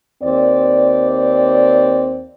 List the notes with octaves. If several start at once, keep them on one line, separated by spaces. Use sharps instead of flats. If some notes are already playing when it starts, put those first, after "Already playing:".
D#2 C4 D5